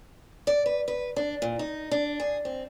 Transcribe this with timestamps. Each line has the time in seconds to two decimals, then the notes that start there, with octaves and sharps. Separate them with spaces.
0.47 D5
0.66 B4
0.88 B4
1.16 D4
1.42 A#2
1.59 D#4
1.91 D4
2.20 G#4
2.45 C4